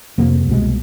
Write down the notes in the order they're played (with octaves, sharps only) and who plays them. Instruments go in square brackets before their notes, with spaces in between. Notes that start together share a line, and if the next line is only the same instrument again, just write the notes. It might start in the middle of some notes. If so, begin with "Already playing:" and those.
[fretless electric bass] F2 C3 F3 A#3
C2 B2 G#3